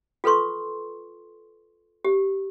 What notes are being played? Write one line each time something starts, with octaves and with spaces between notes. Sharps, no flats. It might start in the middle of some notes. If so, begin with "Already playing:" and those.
F4 A4 B4 C6 C#6
G4